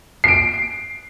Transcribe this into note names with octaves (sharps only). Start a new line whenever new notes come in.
C7 D7